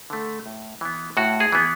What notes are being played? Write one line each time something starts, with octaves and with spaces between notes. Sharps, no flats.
D3 A3
A2
E3 B3
A2 F#4
G#4
E3 B3